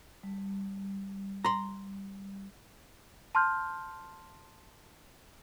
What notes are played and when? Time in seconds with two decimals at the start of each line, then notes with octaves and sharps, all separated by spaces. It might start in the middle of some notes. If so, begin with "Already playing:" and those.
0.23 G3
1.45 A#5 C6
3.35 A5 C6 F6 G6